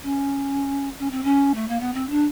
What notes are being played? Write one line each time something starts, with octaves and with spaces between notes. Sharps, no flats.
C#4
C#4
C4
C#4
A3
A#3
B3
C4
D4